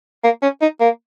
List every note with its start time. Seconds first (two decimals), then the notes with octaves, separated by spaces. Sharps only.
0.24 A#3
0.42 C#4
0.62 D#4
0.80 A#3